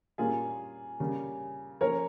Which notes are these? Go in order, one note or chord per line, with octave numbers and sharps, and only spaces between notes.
A#2 G3 A#3 C#4 F4 G#4
C#3 G3 A#3 C#4
F3 A#3 C#4 A#4 C#5